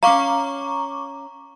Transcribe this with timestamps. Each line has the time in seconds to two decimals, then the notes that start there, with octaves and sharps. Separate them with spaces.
0.03 C#4 F5 A#5 C#6 D6